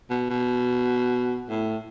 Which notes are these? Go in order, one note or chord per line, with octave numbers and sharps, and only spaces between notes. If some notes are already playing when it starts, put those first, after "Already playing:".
B2
B2
A2